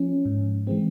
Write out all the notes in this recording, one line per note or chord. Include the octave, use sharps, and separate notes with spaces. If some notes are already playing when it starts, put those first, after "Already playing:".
Already playing: F3 C#4
G#2
E3 G#3 C4